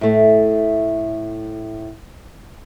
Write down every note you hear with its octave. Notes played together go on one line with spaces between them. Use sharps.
A2 A3